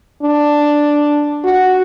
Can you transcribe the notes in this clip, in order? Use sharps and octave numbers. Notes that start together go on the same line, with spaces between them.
D4
F#4